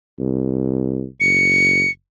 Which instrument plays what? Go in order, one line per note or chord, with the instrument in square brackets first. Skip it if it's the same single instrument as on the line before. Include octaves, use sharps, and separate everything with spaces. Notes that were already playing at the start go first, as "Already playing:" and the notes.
[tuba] C2
[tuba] F#1 [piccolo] C#7